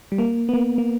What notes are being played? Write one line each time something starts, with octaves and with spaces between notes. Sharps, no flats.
G3
A#3
B3
A#3
A#3